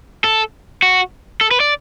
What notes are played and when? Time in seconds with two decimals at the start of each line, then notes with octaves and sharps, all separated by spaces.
0.24 A4
0.82 F#4
1.41 A4
1.51 B4
1.60 D5